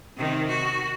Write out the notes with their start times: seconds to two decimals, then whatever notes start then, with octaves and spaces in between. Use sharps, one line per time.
0.16 C3 D#3
0.48 F#4